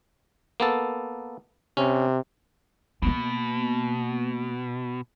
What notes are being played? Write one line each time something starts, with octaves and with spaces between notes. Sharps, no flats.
A#3 B3 A4
C3 C#4
B2 A#3 B3